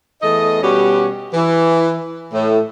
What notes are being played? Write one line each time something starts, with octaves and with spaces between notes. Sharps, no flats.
E2 A3 D#5
B2 G3 C#4 F#4 G4
E3
A2